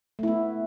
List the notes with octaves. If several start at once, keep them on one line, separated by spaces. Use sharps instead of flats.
A3 B3 E4